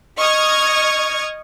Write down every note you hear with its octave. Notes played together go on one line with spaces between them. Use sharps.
D#5 C#6 D#6 F6 G#6